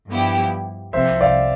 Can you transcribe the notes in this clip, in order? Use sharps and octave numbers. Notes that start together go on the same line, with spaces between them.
G2 F3 B3 E4 G4
C2 C3 F3 C5 E5
D5 F5